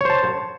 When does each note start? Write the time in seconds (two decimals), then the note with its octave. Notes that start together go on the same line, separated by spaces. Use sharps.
0.01 C#5
0.05 C5
0.10 A5